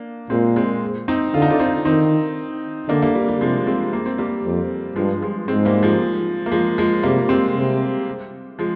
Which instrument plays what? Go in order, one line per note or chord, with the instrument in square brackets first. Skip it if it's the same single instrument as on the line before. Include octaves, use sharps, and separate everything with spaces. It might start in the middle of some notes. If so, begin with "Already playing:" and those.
Already playing: [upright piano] A#3 D4
[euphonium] A#2 [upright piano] G#3 C4
[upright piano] G#3 C4
C4 D#4
[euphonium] D3 [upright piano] F4
[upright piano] D#4
D4 F4
C4 D#4
[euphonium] D#3 [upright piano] C4 D#4
[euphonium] D3 [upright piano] A#3 D4
[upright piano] G3 A#3
G3
G3
[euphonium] C3 [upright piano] F3 G#3
[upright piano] G#3 C4
A#3
C4
G3 A#3
[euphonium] F2
[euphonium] G2 [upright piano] F3 G#3
[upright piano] F3 G#3
[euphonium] G#2 [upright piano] G#3 C4
[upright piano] G3 A#3
F3 G#3
A#3
F3 G#3
F3 G#3
[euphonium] C3 [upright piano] G3 A#3
[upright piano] G#3 C4
[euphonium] C3
[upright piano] F3 G#3